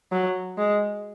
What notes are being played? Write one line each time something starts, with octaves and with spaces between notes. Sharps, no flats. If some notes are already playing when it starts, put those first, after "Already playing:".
F#3
G#3